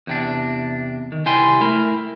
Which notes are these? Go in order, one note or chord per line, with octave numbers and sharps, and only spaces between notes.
E2 C3 D4
D#3
C2 G3 E4 G5 G#5 C6
A3 E4 A#4